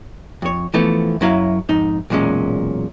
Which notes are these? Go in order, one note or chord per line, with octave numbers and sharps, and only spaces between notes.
F2 C#5
E3 F3 A3 B3
F#2 F#3 E4 D5 F5
F2 G#2 D#4
B1 E2 A#2 G#3 C#4